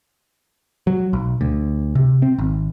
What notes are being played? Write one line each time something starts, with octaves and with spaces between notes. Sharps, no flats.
F#3
B1
D2
C3
C4
G#1